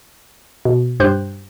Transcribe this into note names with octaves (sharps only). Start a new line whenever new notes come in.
B2
G2 G4 C5 F#6 G6